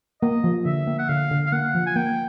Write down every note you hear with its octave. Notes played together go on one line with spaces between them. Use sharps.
A#3 D#5
F3
D3 E5
A#3
F#5
D3 F5
D3
F5
A#3 F#5
F3
G#5
A#3 G5